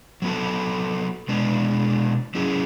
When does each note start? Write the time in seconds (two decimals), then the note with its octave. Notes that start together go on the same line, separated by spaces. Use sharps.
0.22 F#3 B3 F#4 A4
1.28 B2 G#3 B3 D4
2.35 F#3 C#4 E4 G#4